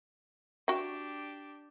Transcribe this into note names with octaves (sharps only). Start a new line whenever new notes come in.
D4 F#4 G4 G5